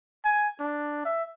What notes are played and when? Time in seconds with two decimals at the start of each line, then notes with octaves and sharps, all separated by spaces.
0.25 G#5
0.60 D4
1.05 E5